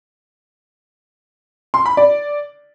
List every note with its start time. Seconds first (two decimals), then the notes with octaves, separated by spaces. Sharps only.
1.74 C6
1.86 B5
1.97 D5